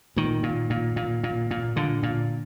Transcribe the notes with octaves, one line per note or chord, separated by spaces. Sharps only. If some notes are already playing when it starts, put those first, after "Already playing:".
A#2 D#3
A#2
A#2
A#2
A#2
A#2
A#2 D3
A#2